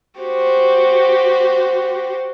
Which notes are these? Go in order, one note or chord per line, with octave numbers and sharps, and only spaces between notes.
F#4 G4 C5